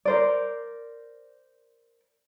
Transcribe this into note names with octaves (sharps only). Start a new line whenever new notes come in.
A#4 C5 D5